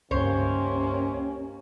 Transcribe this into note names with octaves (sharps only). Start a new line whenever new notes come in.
C#2 G2 C3 D#3 A#3 C#4 C5 C#5